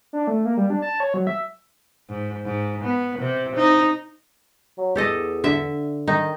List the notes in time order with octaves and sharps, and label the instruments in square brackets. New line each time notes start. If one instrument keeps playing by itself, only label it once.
[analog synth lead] D4
A3
A#3
G3
D4
A5
C#5
F#3
E5
[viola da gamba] G#2
G#2
B3
C3
D#4
[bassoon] F#3
[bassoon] E2 [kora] G4 A4 D#5
[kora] D3 E5
[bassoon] D#3 [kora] D#4